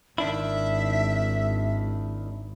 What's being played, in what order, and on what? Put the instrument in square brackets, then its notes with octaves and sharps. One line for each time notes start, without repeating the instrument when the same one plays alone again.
[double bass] G#1 [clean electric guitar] D#3 D4 E4 [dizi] E5